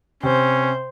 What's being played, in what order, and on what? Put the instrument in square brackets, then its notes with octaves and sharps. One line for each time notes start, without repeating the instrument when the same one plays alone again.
[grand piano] C3 [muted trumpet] C#4 [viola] C5